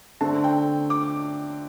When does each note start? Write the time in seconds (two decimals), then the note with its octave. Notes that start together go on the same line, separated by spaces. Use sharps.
0.21 D3 A3 C4 A5
0.44 G5
0.90 D6